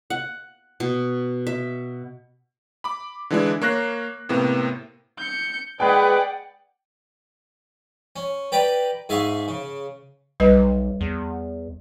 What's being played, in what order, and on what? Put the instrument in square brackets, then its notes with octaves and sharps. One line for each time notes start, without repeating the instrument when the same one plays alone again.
[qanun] F#5
B2
E5
[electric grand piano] B5 D6
D3 E3 G#3 D4 E4
A#3 C#5 F#6 A#6 C7
A2 C3 A#3 B3
[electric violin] G6 C#7
[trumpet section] G#3 G#4 B4 [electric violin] D5 F#5 [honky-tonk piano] G5
[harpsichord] C#4
G4 B4 D5 G5 A#5
G#2 G#4 E5 F5 G#5 C#6
C#3
[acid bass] B1 [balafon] G3 B4 D#5
[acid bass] E2